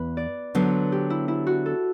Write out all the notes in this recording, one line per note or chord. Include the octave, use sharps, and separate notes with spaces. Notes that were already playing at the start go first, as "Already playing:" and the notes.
Already playing: E2 B4
D5
D3 F#3 B3 C5
G4
E4
E4
F#4
A4